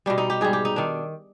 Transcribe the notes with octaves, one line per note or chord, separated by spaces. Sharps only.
B2 G3 D4
D#4
G4
G#2 G3 G#4
G4
D#4
D#3 D4